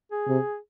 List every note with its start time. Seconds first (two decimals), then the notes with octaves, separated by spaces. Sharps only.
0.12 G#4
0.28 C3